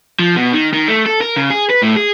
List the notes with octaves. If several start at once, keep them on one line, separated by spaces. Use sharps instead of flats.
F3
B2
D#3
D#3
A3
A4
A#4
C#3
G#4
B4
A2
G#4